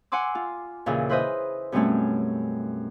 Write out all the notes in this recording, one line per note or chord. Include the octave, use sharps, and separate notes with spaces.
F#5 G#5 C6 D6 E6
F4
D#2 A#2 C#3 E3
E4 B4 C5 D#5 E5
F#2 B2 G3 A3 C4 C#4